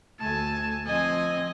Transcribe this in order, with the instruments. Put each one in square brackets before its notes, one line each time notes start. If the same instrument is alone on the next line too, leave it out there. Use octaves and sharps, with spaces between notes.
[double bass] D2 A3 [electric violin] G#5 A5
[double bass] F3 [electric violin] C4 G#5 [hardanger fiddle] D#5